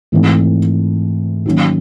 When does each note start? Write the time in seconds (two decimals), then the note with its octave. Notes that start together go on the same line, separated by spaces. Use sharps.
0.12 G#2 E3 A3 C4
1.46 D#3 F#3 A#3 C#4